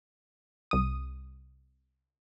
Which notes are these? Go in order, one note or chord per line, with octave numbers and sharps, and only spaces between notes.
C2 D#6